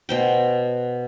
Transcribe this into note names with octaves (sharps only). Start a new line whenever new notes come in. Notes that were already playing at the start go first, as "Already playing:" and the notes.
B2 C5 G5